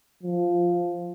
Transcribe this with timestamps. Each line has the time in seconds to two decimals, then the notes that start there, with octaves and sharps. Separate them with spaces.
0.23 F3